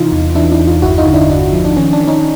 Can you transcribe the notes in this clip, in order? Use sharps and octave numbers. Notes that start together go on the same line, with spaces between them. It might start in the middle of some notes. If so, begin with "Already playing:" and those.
Already playing: C3 E3 D#4 F4
E2
E3 D4 E4
D4 E4
E2
D#4 F4
G1 E4 F#4
D#4 F4
D3
D4 E4
G1 D4
F3
D4
D#3 C#4
D4
D#3
C#4 D#4